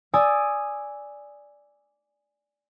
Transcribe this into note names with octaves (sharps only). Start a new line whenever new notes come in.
D5 G#5 D#6 E6